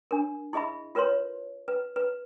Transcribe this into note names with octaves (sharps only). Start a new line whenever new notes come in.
D4 A#4
E4 G#4 D#5 E5 B5
F4 A#4 B4 C#5 C6
B4
B4